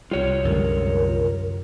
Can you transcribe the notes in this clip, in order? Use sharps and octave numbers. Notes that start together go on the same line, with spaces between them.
C2 G3 F4 C#5
F#2 D3 G#3 A#4